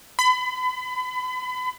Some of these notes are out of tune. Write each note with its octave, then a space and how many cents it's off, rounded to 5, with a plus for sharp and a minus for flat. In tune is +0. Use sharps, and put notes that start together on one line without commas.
B5 +35